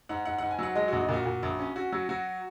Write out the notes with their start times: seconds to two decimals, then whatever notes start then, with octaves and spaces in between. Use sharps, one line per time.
0.09 G#2 F#5
0.25 G#2 F#5
0.38 G#2 F#5
0.51 G#5
0.59 F#3 F#5
0.75 G#3 D#5
0.88 A#1 F#4
1.01 D#4
1.09 A#2 F#4
1.26 A#2
1.43 A#1
1.59 C#4
1.76 C#4 F#4
1.92 F#3 F#4
2.09 F#3 F#4